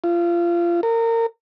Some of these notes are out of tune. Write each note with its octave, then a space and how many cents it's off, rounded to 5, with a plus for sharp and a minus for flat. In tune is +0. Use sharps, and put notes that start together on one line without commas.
F4 -25
A#4 -30